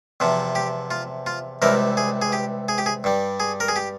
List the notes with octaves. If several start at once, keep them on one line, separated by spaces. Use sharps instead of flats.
E2 C3 F3
G4
F4
F4
C#2 C3 E3 G3 A#4
G#4
G#4
G4
G#4
G4
G#4
G2 G3
G#4
A#4
G#4
G4